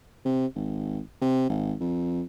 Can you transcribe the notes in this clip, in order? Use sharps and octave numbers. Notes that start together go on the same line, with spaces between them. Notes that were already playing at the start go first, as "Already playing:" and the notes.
C3
G#1
C3
G#1
F2